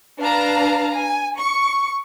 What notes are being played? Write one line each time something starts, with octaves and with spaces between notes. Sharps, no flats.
D4 B4 F5 A5 A#5
G#5
C#6